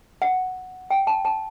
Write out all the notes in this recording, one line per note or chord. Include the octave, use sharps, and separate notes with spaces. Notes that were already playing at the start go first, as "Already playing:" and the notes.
F#5
G5
A5
A5